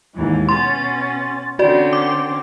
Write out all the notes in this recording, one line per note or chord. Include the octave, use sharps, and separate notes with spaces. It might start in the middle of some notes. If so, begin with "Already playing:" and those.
D#2 G#2 E3
B2 C#4 C6 A6
D3 C4 C#4 F#4 D5
D6